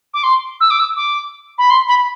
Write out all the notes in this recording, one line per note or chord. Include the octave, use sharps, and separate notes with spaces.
D6
C6
E6
D6
E6
D6
B5
C6
B5